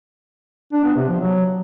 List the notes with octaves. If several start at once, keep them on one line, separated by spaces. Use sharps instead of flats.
D4
B3
C3
F3
F#3